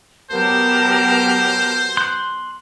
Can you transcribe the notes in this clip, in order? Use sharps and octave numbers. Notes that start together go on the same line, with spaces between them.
F#3 B3 G4 A#4 C5 A5
C6 F#6